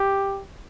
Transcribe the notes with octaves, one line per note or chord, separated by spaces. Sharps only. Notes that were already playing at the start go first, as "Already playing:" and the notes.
Already playing: G4